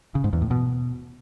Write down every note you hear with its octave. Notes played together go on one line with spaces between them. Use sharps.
C#3
G#2
E2
A2
B2